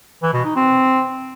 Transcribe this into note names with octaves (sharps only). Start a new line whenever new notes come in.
E3
B2
D#4
C4